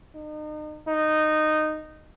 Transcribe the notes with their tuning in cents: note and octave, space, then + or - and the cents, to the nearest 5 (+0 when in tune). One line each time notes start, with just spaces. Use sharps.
D#4 -35
D#4 -10